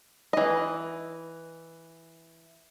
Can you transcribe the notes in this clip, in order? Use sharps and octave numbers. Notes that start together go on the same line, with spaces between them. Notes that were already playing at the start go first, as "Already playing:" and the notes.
E3 D#5